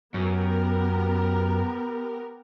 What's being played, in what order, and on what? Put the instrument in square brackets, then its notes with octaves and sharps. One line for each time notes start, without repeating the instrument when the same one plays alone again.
[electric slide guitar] F#2 [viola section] B3 G4 A#4